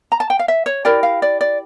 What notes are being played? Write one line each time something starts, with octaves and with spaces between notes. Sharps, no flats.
A#5
A5
G5
F5
E5
C#5
E4 G4 A#4 D5
F5
D5
D5